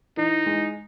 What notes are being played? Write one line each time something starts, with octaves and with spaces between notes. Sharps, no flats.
E3 D#4
G#3